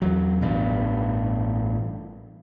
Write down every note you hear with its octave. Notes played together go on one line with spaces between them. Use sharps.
E2 F#3
A1 G2 B2